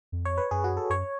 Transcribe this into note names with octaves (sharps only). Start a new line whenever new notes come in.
F2
C#5
B4
F#2 G#4
F#4
A4
F#2 C#5